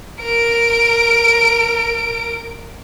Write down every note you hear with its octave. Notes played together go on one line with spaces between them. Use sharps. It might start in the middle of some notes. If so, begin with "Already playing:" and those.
A#4 D7